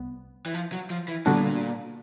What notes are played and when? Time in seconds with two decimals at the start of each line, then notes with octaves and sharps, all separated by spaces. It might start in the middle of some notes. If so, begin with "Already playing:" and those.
Already playing: C2 B3
0.46 E3
0.54 F3
0.72 F#3
0.90 F3
1.08 E3
1.26 A#2 D3 G3 B3 D4 F#4